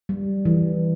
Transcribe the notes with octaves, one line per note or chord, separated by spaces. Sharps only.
G3
E3